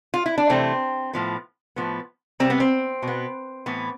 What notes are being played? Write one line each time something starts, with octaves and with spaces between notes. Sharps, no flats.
F4
E4
D4
C3 E3 A3 C4
A2 F3 B3
A2 F3 B3
C3 G3 B3 C4
B3
C4
B2
B3
A2 E3 B3